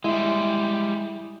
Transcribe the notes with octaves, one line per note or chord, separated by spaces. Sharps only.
G3 G#3 E4 E5